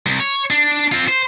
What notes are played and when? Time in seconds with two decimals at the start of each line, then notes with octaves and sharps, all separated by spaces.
0.06 C2
0.20 C#5
0.50 D4
0.92 C4 F4
1.08 C5